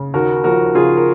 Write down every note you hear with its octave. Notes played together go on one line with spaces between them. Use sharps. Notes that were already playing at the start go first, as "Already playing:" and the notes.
Already playing: C#3
D#2 F#4 A#4
F3 F#4 A#4
C#3 F4 G#4
A#4